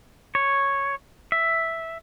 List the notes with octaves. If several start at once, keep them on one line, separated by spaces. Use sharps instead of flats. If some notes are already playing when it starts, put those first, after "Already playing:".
C#5
E5